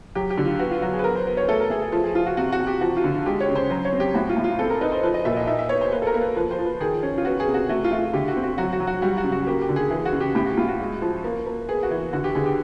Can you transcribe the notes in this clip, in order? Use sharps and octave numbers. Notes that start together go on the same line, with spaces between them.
F#3 G4
G4
D3
F4
B3 F#4
F4
F#3 F#4
G#4
B4
B3 A#4
C5
B3
C#5
A3 A4
A#4
A3 G#4
G#4
F3
G#4
F3 F4
F#4
C3 F#4
F#4
C3
G4
F3 F#4
F4
D3
G#3 G4
C#5
C#3
C5
F#3 C5
C#5
C4
G4
A2 F#4
F4
A2
F4
C4 A4
A#4
D#4 B4
C5
F3 B4
D#5
A#2 E5
D#5
D#4 E5
E5
B3 C#5
C5
A#3 B4
A4
A#4
A#3
B4
F3 B4
C5
F3
B4
D#3 G#4
C#4
F4
B3 F#4
G#4
C3
F#4
A3 F#4
F4
A3
F4
D3 G4
F#4
C4
F#4
F#3 F#4
F#4
F#3
F#4
G3 F#4
F#4
C#3
F#4
A#3 G4
G4
D3
G#4
E3 G#4
F#4
C#3
G4
A2 G4
F#4
A2 F4
F#4
G#3
F3
A#3
A#3
B3 G#4
F#4
E3
D3 F#4
G4
D3 G#4
G4